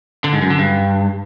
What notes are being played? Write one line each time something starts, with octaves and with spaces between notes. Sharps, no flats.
D3
G#2
F#2
D3
G2